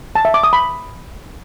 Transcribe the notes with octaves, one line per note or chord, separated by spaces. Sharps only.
A5
E5
D6
D#6
B5